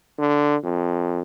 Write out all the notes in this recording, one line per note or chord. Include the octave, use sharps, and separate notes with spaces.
D3
F2